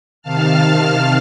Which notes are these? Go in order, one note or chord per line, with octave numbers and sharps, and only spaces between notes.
C3 D#3 F5 A5 F6